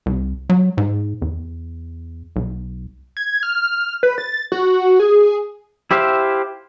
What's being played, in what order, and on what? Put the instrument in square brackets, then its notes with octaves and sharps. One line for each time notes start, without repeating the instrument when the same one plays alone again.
[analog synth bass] C2
F#3
G#2
E2
B1
[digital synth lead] G#6
F6
B4
A6
F#4
G#4
[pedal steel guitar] E4 G4 C5 E5 F5